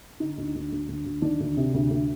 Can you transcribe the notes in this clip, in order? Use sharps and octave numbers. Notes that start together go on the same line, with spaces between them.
D3 D#4
D2
D2
D2
D2
D2
D#3 D4
D2
C3
D2
D2